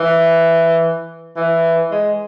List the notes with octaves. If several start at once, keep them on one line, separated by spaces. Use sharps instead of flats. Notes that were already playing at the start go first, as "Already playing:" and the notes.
Already playing: E3
E3
G#3